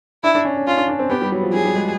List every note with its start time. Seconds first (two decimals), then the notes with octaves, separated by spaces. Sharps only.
0.24 D4 E4
0.35 D4
0.45 C#4
0.57 C#4
0.67 C#4 F4
0.77 D4
0.88 D4
0.99 C4
1.10 B3 G4
1.22 G3
1.32 F#3
1.43 F3
1.53 F#3 G#4
1.65 G3
1.76 G#3